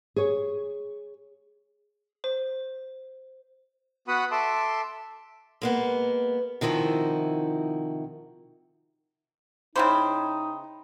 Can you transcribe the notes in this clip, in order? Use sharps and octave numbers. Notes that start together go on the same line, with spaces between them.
G#4 C#5
C5
B3 F#4 F#5 B5 D#6
A4 E5 A5 C6 D6
G#3 A#3 B3
C3 D#3 F3 E4 F#4
C#3 D#4 E4 C5 G5 B5 D6